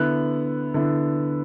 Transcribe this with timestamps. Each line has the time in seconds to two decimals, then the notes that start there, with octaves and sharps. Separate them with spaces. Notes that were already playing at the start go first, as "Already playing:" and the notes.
Already playing: D3 B3 E4 F#6
0.74 D3 B3 E4